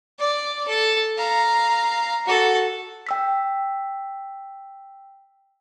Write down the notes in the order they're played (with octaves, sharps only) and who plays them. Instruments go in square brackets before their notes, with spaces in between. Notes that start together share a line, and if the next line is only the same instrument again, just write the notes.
[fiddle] D5
A4
F5 A#5
F#4 A4
[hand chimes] G5 E6 B6